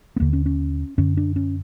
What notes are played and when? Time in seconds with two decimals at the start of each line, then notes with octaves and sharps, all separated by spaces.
0.16 B3
0.20 D#2 D3 A#3
0.33 C#4
0.46 C#4
0.98 F#2 D3 C#4
1.17 D4
1.36 C#4